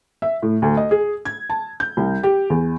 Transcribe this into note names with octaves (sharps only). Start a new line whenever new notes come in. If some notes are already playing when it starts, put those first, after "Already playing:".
E5
A2
D2
D#5
G#4
G#6
A5
G6
C2
G4
E2